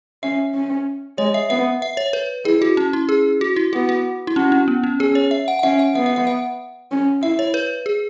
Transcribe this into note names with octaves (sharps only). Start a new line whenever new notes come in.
C#4 E5
C#4
G#3 C#5
E5
B3 E5
E5
C#5
B4
E4 G#4
F#4
C#4
E4
G#4
F#4
E4
B3 F#4
F#4
E4
C#4 F#4
C#4
B3
C#4
C#4 G#4
C#5
E5
F#5
F#5
C#4 E5
F#5
B3 E5
E5
E5
F#5
C#4
E4 E5
C#5
B4
G#4